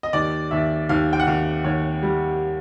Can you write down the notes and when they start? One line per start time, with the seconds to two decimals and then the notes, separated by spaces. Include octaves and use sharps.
0.03 D#5
0.13 D#2 D5
0.51 D#2 E5
0.89 D#2 F5
1.13 G5
1.20 F#5
1.27 D#2 F5
1.64 D#2 C#5
2.03 G3